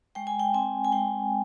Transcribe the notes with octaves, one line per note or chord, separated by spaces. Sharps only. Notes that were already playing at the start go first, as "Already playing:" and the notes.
G#3 G5
G#5
G5
C4 G#5
G#5
G#3 G5